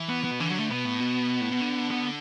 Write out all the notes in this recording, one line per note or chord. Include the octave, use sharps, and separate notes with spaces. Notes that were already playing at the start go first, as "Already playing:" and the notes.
Already playing: E3
B3
B3
B2
D3 E3
F#3
A3
B2 B3
A2
B2
A2
B2
D3
B3